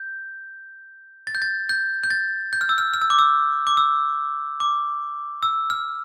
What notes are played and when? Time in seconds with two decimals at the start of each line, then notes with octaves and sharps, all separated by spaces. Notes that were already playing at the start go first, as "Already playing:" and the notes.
Already playing: G6
1.27 A6
1.35 G6
1.42 A6
1.69 G6
2.04 G6
2.10 A6
2.53 G6
2.61 F6
2.69 E6
2.78 F6
2.94 F6
3.02 E6
3.10 D6
3.19 E6
3.67 D6
3.77 E6
4.60 D6
5.43 E6
5.70 F6